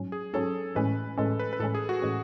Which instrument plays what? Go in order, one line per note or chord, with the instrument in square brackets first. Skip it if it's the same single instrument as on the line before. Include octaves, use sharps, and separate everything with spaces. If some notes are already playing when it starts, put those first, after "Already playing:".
Already playing: [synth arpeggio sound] G#2 F#3 C#4
[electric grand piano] G#4
[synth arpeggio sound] G#2 F#3 C#4 [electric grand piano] A4
[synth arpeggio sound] A2 E3 G#3 C#4 [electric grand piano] B4
[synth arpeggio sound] A2 E3 G#3 C#4 [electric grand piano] A4
[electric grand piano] B4
B4
[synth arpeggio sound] A2 E3 G#3 C#4 [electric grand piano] A4
[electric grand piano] G#4
F#4
[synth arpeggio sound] A2 E3 G#3 C#4